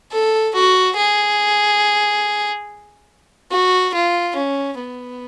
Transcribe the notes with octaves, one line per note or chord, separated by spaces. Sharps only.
A4
F#4
G#4
F#4
F4
C#4
B3